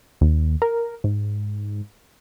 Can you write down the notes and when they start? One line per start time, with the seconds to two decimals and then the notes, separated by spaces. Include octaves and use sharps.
0.21 D#2
0.62 A#4
1.04 G#2